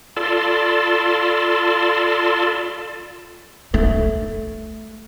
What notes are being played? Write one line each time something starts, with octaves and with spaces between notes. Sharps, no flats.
F4 A4 D5 A5 B5 C6
A3